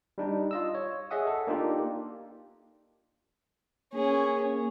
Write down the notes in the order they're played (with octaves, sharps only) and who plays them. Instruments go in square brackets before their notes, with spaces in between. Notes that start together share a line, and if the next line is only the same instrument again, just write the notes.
[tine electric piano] G3 D4 D#4
F4 D#5 E6
C#5
G#4 C#5 D#5 E5 F#5 D#6
A4
A#3 D4 D#4 F4 G4
[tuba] A#3 [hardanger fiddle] C#4 G#4